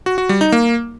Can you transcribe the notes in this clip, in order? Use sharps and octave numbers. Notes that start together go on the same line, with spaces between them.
F#4
F#4
G3
D#4
A#3